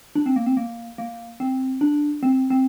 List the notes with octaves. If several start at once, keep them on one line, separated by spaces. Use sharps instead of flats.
D4
C4
A#3
C4
A#3
A#3
C4
D4
C4
C4